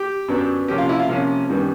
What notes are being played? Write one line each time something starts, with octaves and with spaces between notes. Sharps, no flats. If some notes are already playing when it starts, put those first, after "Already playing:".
Already playing: G4
F#2 D3 F#3 B3 D4
C3 F3 A#3 C#4 G4
F4
E4
F4
C3 F3 A#3 C#4
F#2 D#3 G3 B3 D4